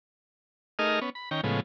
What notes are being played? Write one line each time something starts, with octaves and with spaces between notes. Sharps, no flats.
A3 D#4 G#4 A#4 D#5 F6
B3 C#4
B5
D#3 C#4 G5 A#5
A2 C#3 F3 G#3 B3